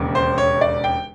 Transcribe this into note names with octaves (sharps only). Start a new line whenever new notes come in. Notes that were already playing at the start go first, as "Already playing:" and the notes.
Already playing: E1 D#2 C#3
C5
C#5
D5
G5